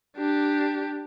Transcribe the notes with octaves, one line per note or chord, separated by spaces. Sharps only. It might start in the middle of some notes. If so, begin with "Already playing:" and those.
D4 G4